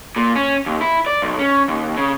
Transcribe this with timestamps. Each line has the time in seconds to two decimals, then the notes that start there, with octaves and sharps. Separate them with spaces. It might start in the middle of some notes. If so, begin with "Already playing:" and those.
0.16 A#2
0.36 C#4
0.66 D#2
0.81 E4
1.06 D5
1.22 B1
1.39 C#4
1.68 D#2
1.96 C#3